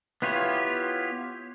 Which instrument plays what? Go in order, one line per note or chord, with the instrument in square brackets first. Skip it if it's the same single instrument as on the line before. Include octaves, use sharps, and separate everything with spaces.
[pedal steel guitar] B3 E4 F4 G4 C#5